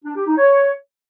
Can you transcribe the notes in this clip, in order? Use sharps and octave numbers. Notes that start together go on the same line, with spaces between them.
D4
G4
D#4
C#5